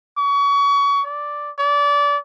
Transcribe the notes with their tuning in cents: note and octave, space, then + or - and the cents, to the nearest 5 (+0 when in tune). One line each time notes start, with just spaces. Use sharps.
C#6 +30
D5 +0
D5 -25